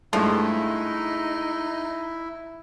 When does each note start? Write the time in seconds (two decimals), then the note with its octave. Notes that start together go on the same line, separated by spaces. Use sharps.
0.13 G2 F3 G#3 A3 D#4 E4